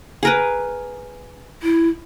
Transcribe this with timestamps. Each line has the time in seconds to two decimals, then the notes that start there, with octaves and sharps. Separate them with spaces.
0.23 G#4 A#4 B4
1.63 E4